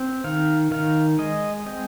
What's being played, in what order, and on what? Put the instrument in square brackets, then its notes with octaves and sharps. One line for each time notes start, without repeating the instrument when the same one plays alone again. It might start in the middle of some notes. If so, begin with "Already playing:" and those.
Already playing: [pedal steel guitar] C4
D#3 F5
D#3 F5
G#3 D#5
C4 D#5